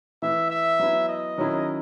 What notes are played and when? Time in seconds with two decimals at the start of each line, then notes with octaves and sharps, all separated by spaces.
0.22 E3 A3 E4 E5
0.50 E5
0.79 F#3 B3 E4
1.08 D#5
1.38 D#3 F#3 C#4 E4